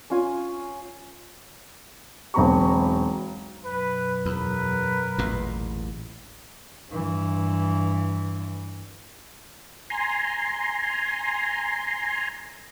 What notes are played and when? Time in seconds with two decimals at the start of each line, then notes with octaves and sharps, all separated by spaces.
0.10 C#4 F4 G#5
2.34 E1 B1 C4 A#5 B5 C#6
3.65 F#2 B2 B4
4.25 E2 A#4 B4
5.18 A1 E2 A#2
6.90 G2 E3
9.90 G#5 A#5 C6